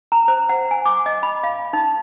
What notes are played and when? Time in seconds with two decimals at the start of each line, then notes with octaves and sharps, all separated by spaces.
0.12 A#5
0.28 C5
0.49 F#5
0.71 G#5
0.86 D6
1.06 D#5
1.23 B5
1.44 F5
1.73 D#4